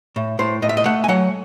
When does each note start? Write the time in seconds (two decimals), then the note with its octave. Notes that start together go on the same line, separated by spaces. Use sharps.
0.16 A2
0.39 A2 C5
0.62 A2 D#5
0.69 E5
0.77 D#5
0.86 A3 F#5
1.04 G#5
1.08 F#3 F#5